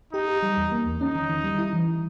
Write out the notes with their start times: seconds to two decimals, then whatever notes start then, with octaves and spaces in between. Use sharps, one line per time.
0.13 D#4 G4
0.28 G4
0.43 G3
0.57 E2
0.72 A#3
0.86 E2
1.01 C#4 D#4
1.15 D#3
1.29 D#3
1.44 G3
1.58 E4
1.73 E3